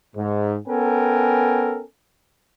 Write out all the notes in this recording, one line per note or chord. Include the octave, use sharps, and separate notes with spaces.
G#2
B3 C#4 A4 A#4 G5 G#5